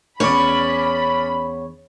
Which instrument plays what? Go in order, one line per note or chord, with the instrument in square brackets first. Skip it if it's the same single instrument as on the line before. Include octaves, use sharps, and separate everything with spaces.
[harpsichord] E2 [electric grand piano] C#4 D5 [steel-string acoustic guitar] C#5 [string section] B5